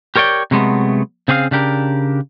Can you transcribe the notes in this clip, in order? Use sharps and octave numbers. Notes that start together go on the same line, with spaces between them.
G4 A#4 C#5 D5 G5
C3 F#3 G#3 A3 B3
C#3 C4 G#4 D5 F5
C#3 D4 G4 A#4